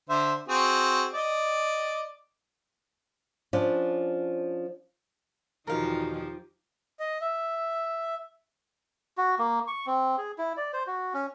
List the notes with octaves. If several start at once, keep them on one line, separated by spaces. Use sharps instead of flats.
D3 C5 E5
C4 F#4 G#4
D5 D#5
F3 C#4 D4
E2 B2 D#3 F3 D#4 G4 A#4 F5
D#5
E5
F#4
A#3
C#6
C4
G#4
E4
D5
C5
F#4
C#4